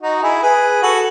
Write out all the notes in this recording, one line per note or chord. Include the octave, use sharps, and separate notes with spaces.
D#4 F#4
E4 G#4
G#4 B4
F#4 A4